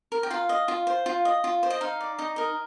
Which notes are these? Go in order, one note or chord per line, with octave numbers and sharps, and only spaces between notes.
A#4
G5
F4 F5
D#5
F4
C5
F4
D#5
F4
C5
D#5
D#4 F5
D5
D#4 D#5
A#4 D#5